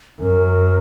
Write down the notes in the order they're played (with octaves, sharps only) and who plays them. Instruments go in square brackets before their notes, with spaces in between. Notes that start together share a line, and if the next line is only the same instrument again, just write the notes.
[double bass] F#2 [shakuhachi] A#4